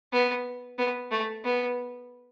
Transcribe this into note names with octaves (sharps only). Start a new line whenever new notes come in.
B3
B3
A3
B3